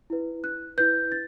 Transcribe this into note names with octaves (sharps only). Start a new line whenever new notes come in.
E4 B4
F#6
E4 B4 G6
A6